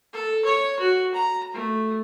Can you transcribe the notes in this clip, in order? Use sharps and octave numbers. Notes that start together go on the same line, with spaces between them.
A4
C#5
F#4
A#5
A3